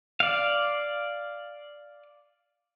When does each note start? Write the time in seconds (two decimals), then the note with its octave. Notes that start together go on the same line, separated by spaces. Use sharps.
0.20 D5 F5